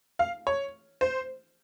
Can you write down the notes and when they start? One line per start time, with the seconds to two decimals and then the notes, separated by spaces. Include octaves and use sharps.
0.19 F5
0.47 C#5
1.01 C5